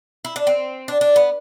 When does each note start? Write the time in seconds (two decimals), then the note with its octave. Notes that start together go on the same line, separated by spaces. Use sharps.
0.25 E4
0.36 D4
0.47 C4
0.88 D4
1.01 D4
1.16 B3